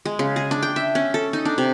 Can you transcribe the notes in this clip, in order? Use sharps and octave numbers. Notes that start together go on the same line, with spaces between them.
G#3
C#3
G#4
D4
G5
E5
C#4
A4
D#4
D4
C3